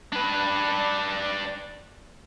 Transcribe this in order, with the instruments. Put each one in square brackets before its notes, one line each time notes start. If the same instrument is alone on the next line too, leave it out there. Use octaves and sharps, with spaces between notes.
[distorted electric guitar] D4 B4